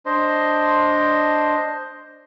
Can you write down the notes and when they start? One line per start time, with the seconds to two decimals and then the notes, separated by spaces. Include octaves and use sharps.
0.06 D4 C5 D#5 C6